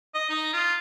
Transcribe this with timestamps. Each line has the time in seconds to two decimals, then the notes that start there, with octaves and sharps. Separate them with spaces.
0.14 D#5
0.30 D#4
0.53 F4